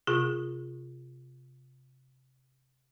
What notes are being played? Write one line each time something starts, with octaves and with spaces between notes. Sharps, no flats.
C3 F4 G#4